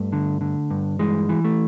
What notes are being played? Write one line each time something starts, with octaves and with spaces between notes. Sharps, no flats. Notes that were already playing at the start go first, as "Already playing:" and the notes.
Already playing: G2 A3
D3
D3
G2
E3 G#3
E3
A3